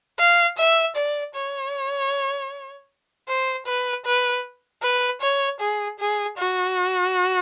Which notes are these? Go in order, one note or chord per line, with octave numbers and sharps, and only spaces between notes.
F5
E5
D5
C#5
C5
B4
B4
B4
C#5
G#4
G#4
F#4